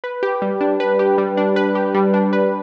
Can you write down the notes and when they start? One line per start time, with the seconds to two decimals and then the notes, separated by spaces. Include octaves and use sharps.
0.04 B4
0.23 G4
0.42 G3
0.61 D4
0.80 B4
0.99 G4
1.18 G3
1.37 D4
1.56 B4
1.75 G4
1.94 G3
2.14 D4
2.33 B4